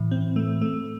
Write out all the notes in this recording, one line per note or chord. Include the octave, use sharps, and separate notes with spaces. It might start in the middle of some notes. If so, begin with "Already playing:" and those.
Already playing: A2 E3
C4
A3
A3